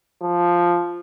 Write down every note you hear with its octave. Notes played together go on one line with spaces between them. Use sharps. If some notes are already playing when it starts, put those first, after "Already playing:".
F3